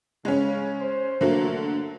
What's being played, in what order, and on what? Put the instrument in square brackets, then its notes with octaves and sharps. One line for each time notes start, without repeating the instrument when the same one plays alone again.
[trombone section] C#3 [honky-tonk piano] G#3 C#4
[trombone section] C5
[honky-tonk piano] D3 F#3 A#3 [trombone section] A3